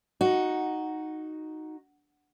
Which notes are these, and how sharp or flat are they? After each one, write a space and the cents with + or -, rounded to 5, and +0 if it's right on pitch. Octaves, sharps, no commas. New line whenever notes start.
D#4 +0 F#4 +0